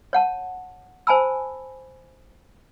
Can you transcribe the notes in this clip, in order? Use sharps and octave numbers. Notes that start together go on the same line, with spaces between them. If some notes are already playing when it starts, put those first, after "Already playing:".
C#5 F#5 A5
C5 G#5 A5 B5 E6